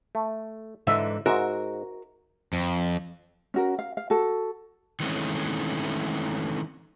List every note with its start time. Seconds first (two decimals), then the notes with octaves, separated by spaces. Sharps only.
0.15 A3
0.87 G#2 D3 E3 E5
1.26 G#2 F#4 A#4 E5
2.53 F2
3.54 C#4 F#4 A#4
3.79 F5
3.97 F5
4.10 F#4 A4
5.00 D#3 E3 G#3 A3 C4 C#4